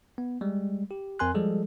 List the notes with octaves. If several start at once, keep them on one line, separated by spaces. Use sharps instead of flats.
B3
G3 G#3
G4
F2 C4 A#4 G#5 C6 F#6
F3 G3 G#3 G#4 A4